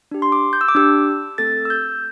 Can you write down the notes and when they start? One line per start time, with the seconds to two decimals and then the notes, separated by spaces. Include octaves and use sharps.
0.11 D4 G4
0.22 C6
0.32 D6
0.53 G6
0.61 E6
0.68 D6
0.75 D4 G4 E6
1.38 A3 C4 A4 A6
1.65 E6
1.70 G6